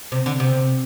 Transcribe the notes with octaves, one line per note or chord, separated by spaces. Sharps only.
C3
D3
C3